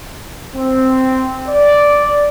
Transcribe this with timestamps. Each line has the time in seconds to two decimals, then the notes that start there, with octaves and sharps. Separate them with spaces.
0.55 C4
1.48 D5